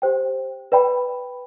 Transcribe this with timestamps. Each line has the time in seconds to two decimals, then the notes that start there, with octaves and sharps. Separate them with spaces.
0.02 G4 C5 G5
0.72 B4 D5 G5 B5